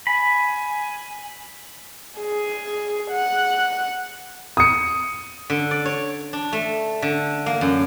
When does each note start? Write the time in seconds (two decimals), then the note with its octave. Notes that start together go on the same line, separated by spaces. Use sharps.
0.07 G#5 B5
2.19 G#4
3.11 F#5
4.57 D#6 C#7
5.50 D3
5.71 D5
5.85 C#5
6.33 D4
6.53 A3
7.02 D3
7.46 A#3
7.61 F#2